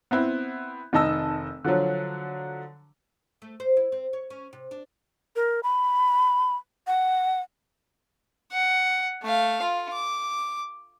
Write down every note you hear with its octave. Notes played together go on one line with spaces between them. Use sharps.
B3 C4 E4
F1 D#3 D#5 A5 E6
D3 F3 F#3
A3
C5
E4
C4
C#5
C#4
C3
D4
A#4
B5
F#5
F#5
A3 F5
F4
D6